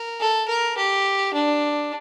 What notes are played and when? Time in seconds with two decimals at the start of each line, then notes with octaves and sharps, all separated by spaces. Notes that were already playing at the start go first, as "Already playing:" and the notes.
Already playing: A#4
0.20 A4
0.48 A#4
0.77 G4
1.34 D4